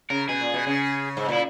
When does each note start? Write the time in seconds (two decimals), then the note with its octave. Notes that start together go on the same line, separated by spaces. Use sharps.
0.10 C#3 A#4
0.28 B2 G#4
0.41 A#2
0.54 B2
0.67 C#3
1.17 G#2
1.29 A#2 E4